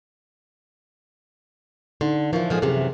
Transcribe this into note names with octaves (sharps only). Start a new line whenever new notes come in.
D3 D#4
E3 F3 E4 A#4
G#2 F3 G#4 A4
F#2 C3 E3 G#4